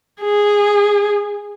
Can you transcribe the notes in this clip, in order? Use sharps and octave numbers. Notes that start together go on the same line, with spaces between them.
G#4